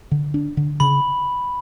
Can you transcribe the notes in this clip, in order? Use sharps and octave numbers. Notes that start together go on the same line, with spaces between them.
D3
D4
D3
C#3 B5